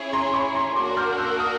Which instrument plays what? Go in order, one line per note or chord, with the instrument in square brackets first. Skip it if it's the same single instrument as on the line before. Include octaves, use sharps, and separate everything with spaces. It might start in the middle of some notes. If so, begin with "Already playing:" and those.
Already playing: [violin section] C#4 E4 G#4 C#5
[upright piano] A#5 C6
B5 C#6
A#5 C6
[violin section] A#3 D4 F#4 A#4 [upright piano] C6 D6
[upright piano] F6 G6
E6 F#6
D#6 F6